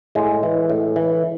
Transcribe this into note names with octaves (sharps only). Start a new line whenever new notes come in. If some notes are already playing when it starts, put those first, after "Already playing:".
A2 G#3
E3
A2
E3